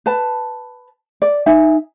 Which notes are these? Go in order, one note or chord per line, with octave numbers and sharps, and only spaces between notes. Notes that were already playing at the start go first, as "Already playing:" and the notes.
B4 A5
D5
D#4 E5 G#5